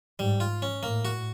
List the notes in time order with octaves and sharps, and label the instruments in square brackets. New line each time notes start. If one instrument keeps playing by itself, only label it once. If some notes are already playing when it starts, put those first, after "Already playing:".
[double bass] G#2 [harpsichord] G3
[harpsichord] F4
C#4
[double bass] A2 [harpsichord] A#3
[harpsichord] F#4